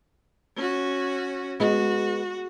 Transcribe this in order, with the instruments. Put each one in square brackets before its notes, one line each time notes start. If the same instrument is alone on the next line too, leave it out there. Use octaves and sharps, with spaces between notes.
[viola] C#4 F#4
[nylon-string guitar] G#3 B3 [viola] F#4